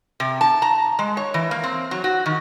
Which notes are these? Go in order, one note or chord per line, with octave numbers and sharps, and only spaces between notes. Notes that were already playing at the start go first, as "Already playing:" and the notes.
C3
A5
A#5
G#3
C#5
E3
A#3
C4
F#3
F#4
D#3